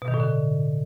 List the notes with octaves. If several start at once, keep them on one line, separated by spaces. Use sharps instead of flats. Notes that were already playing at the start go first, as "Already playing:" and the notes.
B2
D#3
A2
D3